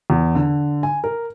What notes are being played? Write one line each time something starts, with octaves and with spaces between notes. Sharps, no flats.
E2
D3
G#5
A#4